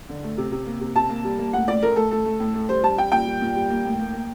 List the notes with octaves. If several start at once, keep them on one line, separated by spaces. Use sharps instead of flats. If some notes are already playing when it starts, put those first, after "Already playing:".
D3
A3
C3
C3
A#3
C3
C3 A5
A#3
G3
A#3
A2 F#5
A2 D5
A3 A#4
A3 A4
A3 A4
A3
A2
A3
G3 C5
G3 A5
G3 G5
A#2 G5
G3
A#2
G3
A#3
A2
A#3
A#3